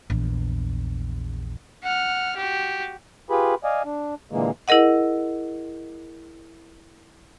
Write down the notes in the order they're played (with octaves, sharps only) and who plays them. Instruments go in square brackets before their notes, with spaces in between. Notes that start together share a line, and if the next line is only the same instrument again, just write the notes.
[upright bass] A#1 E2
[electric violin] F#5 F6
F#4 G4
[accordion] F4 G4 G#4 B4 B5
D5 D#5 F5 G#5
D4
A#2 D3 E3 G#3 A#3
[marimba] E4 G#4 A#4 D#5 F#5